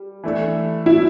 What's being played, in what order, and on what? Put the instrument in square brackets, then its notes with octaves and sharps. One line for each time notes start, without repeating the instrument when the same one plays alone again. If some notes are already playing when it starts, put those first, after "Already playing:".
Already playing: [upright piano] G3
E3 A3 D4 A4
[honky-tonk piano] E4